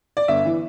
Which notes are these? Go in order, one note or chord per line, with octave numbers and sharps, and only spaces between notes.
D5
G1 E5
E3